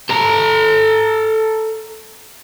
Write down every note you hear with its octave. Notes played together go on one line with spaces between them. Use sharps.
A4 A#5